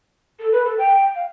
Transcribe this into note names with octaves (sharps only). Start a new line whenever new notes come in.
A4
B4
A4
G5
F5